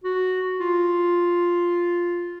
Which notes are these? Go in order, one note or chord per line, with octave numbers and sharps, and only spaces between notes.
F#4
F4